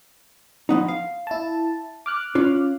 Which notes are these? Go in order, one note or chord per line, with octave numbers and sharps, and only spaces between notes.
F3 B3 D#4
F5
E4 A5
D6 F6 F#6
C#4 F4